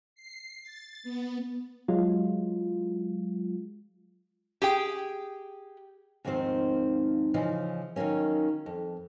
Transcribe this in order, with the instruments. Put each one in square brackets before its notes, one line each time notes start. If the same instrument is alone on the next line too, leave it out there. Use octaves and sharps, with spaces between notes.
[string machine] C7
A6
B3
[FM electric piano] F#3 G#3 F4
[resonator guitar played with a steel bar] G4 G#4 G5
[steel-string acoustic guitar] D#2 G#2 D#3 F3 C4 C5
C#3 E3 F3 D#4
D#3 F3 F#3 A#3 C#4
F2